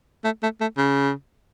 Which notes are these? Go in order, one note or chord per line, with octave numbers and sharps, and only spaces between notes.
A3
A3
A3
C#3